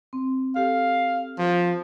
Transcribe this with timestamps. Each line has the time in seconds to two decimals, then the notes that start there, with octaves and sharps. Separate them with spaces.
0.13 C4
0.56 G4 A4 F5
1.38 F3